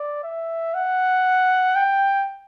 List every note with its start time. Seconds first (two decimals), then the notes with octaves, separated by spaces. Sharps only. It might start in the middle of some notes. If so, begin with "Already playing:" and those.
Already playing: D5
0.24 E5
0.74 F#5
1.75 G5